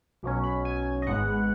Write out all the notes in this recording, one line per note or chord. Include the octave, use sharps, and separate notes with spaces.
B1 B2 F#3 C#4
B5
G#5
D#5
G#1 G#2 G#3 B3 F#5